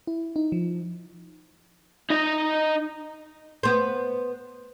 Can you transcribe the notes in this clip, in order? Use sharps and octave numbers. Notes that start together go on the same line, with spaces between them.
E4
D#4
F3
D#4 D#5
B3 C5